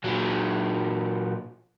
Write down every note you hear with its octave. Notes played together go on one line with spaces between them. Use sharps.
A#2 F#3